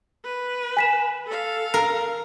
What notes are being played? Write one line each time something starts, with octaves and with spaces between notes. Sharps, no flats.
B4
G#5 B6 E7
A4 F5
A#4